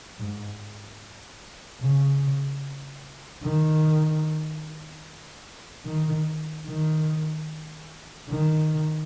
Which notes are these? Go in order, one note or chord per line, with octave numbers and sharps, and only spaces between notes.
G#2
C#3
D#3
D#3
D#3
D#3